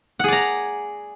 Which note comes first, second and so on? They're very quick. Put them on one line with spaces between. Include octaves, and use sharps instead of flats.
F#5 G#4 D5 A#5